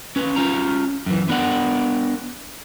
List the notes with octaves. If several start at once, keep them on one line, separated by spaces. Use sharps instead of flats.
C#4 B4
C#4 F4 A#5
F#2 E3
B3 D4 A#4 D5 F#5